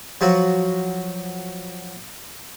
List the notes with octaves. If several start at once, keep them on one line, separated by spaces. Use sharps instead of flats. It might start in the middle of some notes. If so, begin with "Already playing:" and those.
F3 F#3 F#4